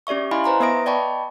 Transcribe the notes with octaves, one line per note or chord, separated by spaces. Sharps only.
C#4 G4 D5 E5 C#6
E4 D#5 F5 G#5 B5 C6
B4 C5 A#5 C6
B3 B4 E5 D#6 A#6 D7
D5 D#5 G5 A5 B5 C#6